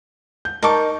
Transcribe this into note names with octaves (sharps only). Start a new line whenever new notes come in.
G6
D#4 A#4 A5 C#6 D6